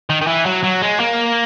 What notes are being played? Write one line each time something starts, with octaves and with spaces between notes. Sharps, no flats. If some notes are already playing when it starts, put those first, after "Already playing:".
D#3
D#3
E3
F#3
F#3
G#3
A#3